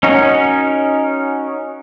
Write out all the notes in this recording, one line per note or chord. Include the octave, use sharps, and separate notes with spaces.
C#4 D#4 F#4 A#4